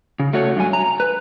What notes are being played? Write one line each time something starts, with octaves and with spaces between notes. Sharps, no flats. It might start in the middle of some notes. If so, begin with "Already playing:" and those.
C#3
A3 F#4 C#5
G2 F#3 G#5
A#5
B4